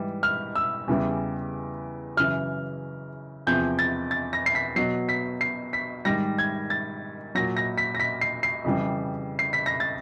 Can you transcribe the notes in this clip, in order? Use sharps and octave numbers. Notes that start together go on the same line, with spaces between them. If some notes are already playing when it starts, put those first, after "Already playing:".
Already playing: G#2 E3 G3
F6
E6
E2 C#3 E3 G3
F#2 C#3 E3 F6
E2 C3 F3 G6
A6
A6
A#6
C7
B6
B2 F#3 C7
B6
C7
B6
G#2 D#3 G3 A#6
G#6
A6
A#2 F#3 A#6
A#6
B6
A#6
B6
C7
C7
F2 C#3 E3 G3
C7
B6
A#6
A6